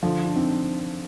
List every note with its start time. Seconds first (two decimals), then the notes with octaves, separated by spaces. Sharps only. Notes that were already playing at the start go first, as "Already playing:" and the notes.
0.03 D3 F3
0.25 D4
0.35 C4 D#4